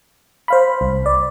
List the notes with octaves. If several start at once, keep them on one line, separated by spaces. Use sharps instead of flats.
C5 F5 B5
C2
D5